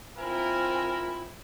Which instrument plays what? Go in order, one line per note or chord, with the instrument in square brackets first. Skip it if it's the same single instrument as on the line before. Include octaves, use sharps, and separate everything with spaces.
[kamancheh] C4 G#5 [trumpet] E4 [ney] F4 [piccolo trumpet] A#4